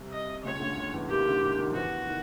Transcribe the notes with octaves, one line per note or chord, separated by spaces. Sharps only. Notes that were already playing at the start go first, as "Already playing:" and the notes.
Already playing: C2 C3
D#5
C#2 C#3 C#5
D2 D3
C#2 C#3
E2 E3
D#2 D#3 G4
D2 D3
D#2 D#3
D#2 D#3
F3
E2 E3 F#4
D#3